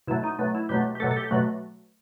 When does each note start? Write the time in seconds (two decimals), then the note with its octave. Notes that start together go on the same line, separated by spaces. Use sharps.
0.07 B2 F#3 A3 E4
0.24 D#4
0.39 B2 F#3 A3
0.55 E4
0.69 B2 F#3 A3 G4
0.95 G4
1.00 B2 F#3 A3 A4
1.11 A4
1.17 G4
1.31 B2 F#3 A3 F#4